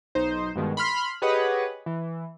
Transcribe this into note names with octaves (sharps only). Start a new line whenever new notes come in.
B1 D#4 C5
G2 B2 D#3 G#3
B5 C6 F6 B6
G4 G#4 B4 C#5 D#5 F#5
E3